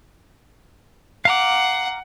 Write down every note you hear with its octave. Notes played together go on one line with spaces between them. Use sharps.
F5 F#5 A#5 D6